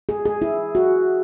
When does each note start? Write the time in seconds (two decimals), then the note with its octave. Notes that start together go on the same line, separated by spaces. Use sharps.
0.09 G#4
0.26 G#4
0.42 E4
0.75 F#4